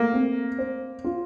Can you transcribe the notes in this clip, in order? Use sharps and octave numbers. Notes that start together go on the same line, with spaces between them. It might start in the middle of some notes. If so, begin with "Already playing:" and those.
Already playing: A3 A#3
C4
C5
F4